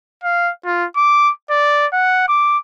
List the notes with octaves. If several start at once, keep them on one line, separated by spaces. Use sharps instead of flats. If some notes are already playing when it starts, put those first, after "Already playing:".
F5
F4
D6
D5
F#5
D6